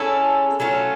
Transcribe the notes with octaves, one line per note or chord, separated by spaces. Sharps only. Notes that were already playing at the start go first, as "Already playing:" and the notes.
Already playing: G#3 C#4 E4 A4
F#3 A3 C#4 F4